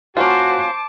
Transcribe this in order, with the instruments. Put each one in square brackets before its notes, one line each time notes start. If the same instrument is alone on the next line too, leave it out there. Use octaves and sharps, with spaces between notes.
[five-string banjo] A#3 C#4 F4 [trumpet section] F#4 [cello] C5 [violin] A5 D6